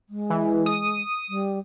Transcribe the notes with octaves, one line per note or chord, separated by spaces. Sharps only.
G#3
E3
D#6
G3